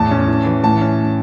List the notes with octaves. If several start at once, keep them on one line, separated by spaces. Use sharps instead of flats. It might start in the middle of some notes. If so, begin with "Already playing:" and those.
Already playing: E2 A2 A5
C#4
E3
E3
A2 A5
C#4